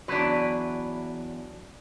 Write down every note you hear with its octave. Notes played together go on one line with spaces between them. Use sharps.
E2 F#3 D4 E4 B4